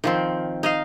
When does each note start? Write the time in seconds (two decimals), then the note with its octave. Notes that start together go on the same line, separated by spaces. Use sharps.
0.04 D#3 F3 C4
0.63 D#4 D#5 F5